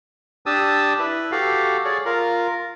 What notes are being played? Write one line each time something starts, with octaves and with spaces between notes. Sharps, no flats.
D4 G4 A5 D#6 E6
E4 B4
F#4 G4 A4 F5
G#4 C#5 D5
F4 A#4